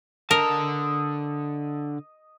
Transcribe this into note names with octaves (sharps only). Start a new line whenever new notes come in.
D3 A#4 D#5 A5